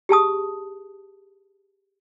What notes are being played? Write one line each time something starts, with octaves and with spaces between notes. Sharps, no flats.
G4 G#4 A5 D#6